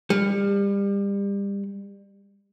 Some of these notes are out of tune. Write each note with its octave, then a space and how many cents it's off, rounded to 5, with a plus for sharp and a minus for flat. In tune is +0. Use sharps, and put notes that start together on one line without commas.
G3 +30